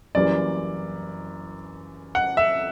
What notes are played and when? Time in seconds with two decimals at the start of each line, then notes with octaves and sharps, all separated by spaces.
0.15 F#1 F#2 E3 G3 A#3 D5
2.15 F#5
2.37 E5